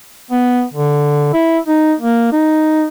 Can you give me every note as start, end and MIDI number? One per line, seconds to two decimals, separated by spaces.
0.31 0.63 59
0.74 1.33 50
1.33 1.59 64
1.67 1.94 63
2.00 2.28 58
2.32 2.86 63